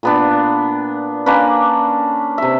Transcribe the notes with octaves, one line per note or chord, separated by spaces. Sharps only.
A#2 B3 D4
A#3 C#4 D4 B4
C3 E5